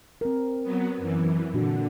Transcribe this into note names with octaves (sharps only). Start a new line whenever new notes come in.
C4 A#4
F#3 B3
F#2 E3
A#2 D3 D4 F#4